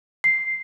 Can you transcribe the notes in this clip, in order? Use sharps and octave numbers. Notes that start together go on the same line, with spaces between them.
C7